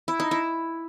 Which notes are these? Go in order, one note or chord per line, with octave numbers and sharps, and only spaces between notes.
E4
D#4
E4